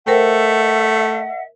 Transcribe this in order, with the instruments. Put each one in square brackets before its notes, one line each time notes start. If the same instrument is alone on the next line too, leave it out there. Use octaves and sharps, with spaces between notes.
[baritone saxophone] A3 [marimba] A#4 C5 G5 [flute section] D#5 E5 F#5